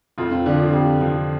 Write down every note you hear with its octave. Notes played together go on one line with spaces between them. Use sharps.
F2 F4
C4
D3 F3 D4
F4
F2 G4
D3 F3